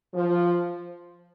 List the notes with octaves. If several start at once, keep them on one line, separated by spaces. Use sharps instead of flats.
F3